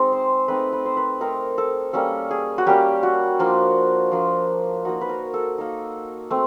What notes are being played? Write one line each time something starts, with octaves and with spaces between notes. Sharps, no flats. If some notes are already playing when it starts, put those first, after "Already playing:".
Already playing: G#3 C4 D#4
C5
A3 C4 D#4 B4
B4
C5
B4
A3 C4 D#4 A#4
A4
G3 A#3 C#4 A4
G#4
F#4
G3 A#3 C#4 G4
F#4
F3 A#3 D4
F3 A#3 D4
A#3 D#4 F#4
B4
A#4
A4
A#3 D#4
A3 C4